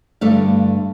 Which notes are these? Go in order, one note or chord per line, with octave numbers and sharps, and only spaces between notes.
G2 D3 A3 F5